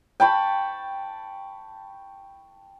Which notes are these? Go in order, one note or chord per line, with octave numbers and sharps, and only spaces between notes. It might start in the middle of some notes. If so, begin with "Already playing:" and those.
G5 A5 B5 C#6